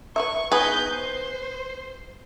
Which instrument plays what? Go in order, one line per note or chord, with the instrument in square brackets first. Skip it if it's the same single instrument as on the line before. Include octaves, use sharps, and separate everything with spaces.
[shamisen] B4 C#5 E5 [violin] C#6
[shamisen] B3 D#4 G#4 [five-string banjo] B4 [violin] D#5 G6
[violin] C5